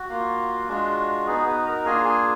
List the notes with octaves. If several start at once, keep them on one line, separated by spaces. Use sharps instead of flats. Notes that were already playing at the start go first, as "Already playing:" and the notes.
Already playing: F#4
A#3 F4
G#3 D4 F4
B3 D#4 F#4 G#4
B3 B4
A#4 A#5
A#3 D4 F4 G#4 G#5
G#4 G#5